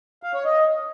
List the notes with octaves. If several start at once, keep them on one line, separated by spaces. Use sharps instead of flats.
F5
C#5
D#5